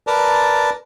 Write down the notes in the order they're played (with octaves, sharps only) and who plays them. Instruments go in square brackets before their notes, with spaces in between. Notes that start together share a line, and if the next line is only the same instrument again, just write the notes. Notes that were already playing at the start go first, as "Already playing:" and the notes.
[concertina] A#4 B4 D5 A5 A#5